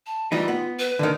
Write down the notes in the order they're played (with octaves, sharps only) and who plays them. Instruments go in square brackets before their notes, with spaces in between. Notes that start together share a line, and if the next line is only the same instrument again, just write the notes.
[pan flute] A5
[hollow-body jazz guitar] E3 G3 D#4 [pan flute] F4
[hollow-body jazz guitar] B3
[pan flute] B4
[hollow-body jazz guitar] D3 D#3